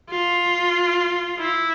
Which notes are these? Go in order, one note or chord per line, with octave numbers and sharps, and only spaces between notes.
F4
E4